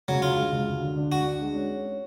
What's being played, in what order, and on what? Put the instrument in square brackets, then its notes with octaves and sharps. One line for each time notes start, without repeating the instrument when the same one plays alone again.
[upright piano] C#3 [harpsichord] F#3
[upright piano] D2 [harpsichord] F4
[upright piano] G#3
C#3
D2
D3
D4
[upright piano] D2 [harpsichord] F#4
[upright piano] D4
G#3
C#4
C#4
C#4